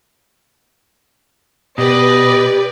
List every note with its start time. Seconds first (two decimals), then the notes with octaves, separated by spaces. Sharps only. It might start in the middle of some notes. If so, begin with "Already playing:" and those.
1.78 B2 G4 B4 D5 D#5